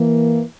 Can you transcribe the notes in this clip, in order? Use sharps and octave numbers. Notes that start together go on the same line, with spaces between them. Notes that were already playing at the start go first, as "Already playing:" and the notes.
Already playing: E3 A#3